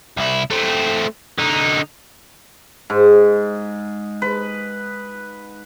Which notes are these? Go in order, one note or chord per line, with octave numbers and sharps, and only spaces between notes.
C2 E4
A3 C4
D3 D#4
G#2
B4